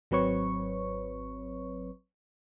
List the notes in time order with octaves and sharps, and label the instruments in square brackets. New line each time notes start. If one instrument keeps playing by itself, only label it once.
[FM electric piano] G#1 F#3 C4 B4 C#5 C#6